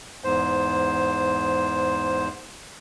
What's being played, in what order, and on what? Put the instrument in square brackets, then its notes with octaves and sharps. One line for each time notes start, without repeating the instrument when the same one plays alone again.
[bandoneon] E2 G#2 C5